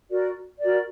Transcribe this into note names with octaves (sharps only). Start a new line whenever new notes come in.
F#4 A#4 D5
F#4 A#4 D5